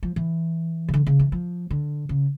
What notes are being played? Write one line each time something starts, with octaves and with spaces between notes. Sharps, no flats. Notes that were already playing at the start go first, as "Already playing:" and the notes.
F3
E3
C#3
D3
C#3
E3
F3
D3
C#3